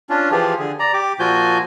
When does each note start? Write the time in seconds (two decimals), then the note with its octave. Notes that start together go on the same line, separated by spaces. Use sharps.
0.10 C#4 D4 F4
0.31 E3 F3 F4 G4 G#4
0.59 D3 G#4
0.79 D5 A#5
0.94 G4 D6
1.19 A#2 F3 F4 F#4 G#5 G6